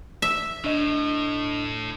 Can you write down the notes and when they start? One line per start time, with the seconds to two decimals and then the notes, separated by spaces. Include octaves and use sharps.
0.22 E5
0.64 A2 D4 D#5